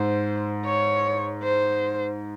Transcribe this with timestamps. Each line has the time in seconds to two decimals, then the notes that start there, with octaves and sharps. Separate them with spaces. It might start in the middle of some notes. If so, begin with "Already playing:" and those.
Already playing: G#2 C5
0.65 C#5
1.43 C5